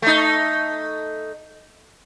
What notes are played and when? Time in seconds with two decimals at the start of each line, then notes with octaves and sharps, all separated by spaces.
0.02 A3 D#4